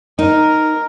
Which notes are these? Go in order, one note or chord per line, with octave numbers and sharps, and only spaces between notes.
D#4 A#4